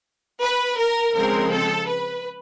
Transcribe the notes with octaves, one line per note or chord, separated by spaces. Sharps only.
B4
A#4
C#3 F3 G#3 C4 A#4
A4
B4